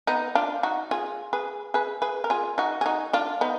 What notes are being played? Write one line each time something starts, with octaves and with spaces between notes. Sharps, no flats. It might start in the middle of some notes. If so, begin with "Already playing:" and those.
B3 D#4
D4 F4
D#4 F#4
F4 G#4
G#4 B4
G#4 B4
G#4 B4
A#4
F4 G#4
D#4 F#4
G#4
D#4 F#4
D4 F4
B3 D#4